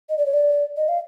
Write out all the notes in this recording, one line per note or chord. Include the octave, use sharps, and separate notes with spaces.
D#5
D5
C#5
D5
D#5
F5